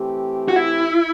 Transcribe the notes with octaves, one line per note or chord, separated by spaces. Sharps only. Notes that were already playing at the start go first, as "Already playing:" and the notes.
Already playing: E3 A3 C4 G4
F#4
E4